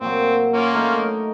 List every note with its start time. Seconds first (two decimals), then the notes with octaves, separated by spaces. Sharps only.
0.01 A#2 F#3 C4
0.54 A#3 C#4 F4
0.73 A3 D#4
0.97 D#5